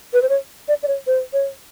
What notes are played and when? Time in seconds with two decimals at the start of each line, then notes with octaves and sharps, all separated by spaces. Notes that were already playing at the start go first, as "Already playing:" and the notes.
0.14 B4
0.22 C5
0.29 C#5
0.68 D5
0.83 D5
0.88 C#5
1.07 C5
1.33 C#5